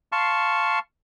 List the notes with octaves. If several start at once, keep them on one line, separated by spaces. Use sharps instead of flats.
F5 A5 C6 C#6